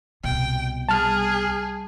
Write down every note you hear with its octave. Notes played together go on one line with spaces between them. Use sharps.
C2 B2 G5
G3 G#4 A5 F6